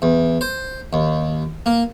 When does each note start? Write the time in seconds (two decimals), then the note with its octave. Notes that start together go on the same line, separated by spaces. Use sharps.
0.02 E2
0.41 C5
0.93 D#2
1.66 A#3